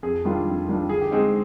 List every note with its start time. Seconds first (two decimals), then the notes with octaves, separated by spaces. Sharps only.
0.03 F2 G#4
0.25 D#3 G3 D4 F4
0.47 F2
0.68 D#3 G3 D4 F4
0.89 D3 G#4
1.02 G4
1.11 G#3 C4 D#4 G#4